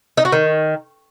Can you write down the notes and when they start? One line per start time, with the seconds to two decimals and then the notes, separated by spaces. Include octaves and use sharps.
0.17 D#4
0.25 F#4
0.32 D#3